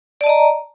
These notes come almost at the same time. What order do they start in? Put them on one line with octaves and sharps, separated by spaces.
D5 A5 D#5 A#5